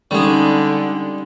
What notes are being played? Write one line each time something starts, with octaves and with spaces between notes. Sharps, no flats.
D3 G3 G#3 C#4 D#4